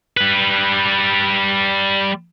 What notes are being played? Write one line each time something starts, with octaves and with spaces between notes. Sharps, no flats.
G3 B4